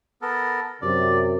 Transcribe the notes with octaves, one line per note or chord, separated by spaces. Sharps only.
B3 A4 A#4
F#2 C3 D5